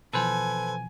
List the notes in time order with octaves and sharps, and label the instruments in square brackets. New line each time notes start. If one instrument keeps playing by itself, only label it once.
[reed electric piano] B2 E3 F3 [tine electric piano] A4 B4 C5 [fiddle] G#5